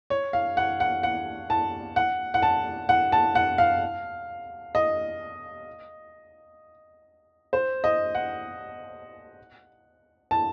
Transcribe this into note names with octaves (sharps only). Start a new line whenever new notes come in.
C#5
F5
F#5
F#5
F#5
A5
F#5
F#5
A5
F#5
A5
F#5
F5
D#5
C5
D#5
F#5
A5